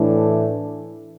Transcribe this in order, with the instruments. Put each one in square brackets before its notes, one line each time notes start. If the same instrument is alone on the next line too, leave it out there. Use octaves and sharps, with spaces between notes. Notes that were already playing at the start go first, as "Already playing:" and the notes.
Already playing: [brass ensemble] A2 E3 A3 D4